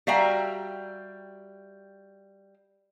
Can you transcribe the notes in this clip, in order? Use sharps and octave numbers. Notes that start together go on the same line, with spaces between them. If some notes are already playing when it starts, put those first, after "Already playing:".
G3 F#4 E5 F5 G5 A#5